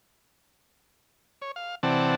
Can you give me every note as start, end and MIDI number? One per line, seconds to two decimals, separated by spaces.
1.42 1.51 73
1.56 1.75 77
1.83 2.15 48
1.83 2.15 52
1.83 2.15 60
1.83 2.15 74
1.83 2.15 78
1.83 2.15 81